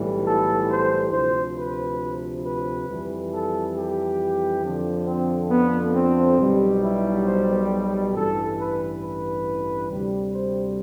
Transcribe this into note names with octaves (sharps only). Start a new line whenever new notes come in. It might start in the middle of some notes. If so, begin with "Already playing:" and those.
Already playing: B1 A2 E3 G3
A4
C5
D2 C3 F3 C5
B4
B4
F2 E3 G3
A4
G4
F2 D3 F3
C4
B3
C4
B1 B2 G3
E4
C5
A1 G2 E3 A4
B4
B4
D2 C3 G3
C5